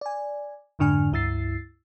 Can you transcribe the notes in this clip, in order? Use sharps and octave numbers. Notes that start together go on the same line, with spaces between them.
D5 G#5
F2 G#2 D3 D4 G#5 F6
C#2 G2 E4 E6 A6 C7